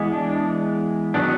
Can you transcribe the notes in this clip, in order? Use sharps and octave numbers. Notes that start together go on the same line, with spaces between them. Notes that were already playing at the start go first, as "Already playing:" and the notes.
Already playing: E3 G#3 B3
D4
D#3 F#3 B3 D4